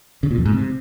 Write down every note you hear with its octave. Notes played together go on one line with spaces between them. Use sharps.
C#3
A#2
F2
G#2
C3